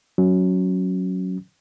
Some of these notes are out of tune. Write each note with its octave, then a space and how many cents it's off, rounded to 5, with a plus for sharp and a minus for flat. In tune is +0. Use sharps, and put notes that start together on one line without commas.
F#3 +0 C#4 +0